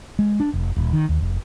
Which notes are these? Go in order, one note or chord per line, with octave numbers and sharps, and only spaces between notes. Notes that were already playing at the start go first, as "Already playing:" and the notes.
G#3
D4
F1
D#1
D#3
D#2
F1